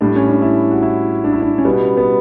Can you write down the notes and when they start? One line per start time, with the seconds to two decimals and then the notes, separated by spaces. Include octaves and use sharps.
0.01 A2 G3 D4
0.16 C#4
0.29 D4
0.42 E4
0.71 F#4
0.82 E4
1.24 D4
1.33 E4
1.42 D4
1.58 C#4
1.64 B2 G3 B3
1.97 B3